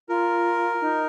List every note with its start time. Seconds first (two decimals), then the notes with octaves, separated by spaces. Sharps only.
0.08 F4 A#4
0.81 D#4